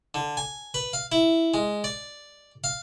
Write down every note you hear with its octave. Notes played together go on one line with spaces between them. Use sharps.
D3
G#5
B4
F5
E4
G#3
D5
F5